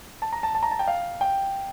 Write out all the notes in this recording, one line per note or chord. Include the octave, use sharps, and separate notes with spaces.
A5
A#5
A5
A5
A#5
A5
G5
F5
G5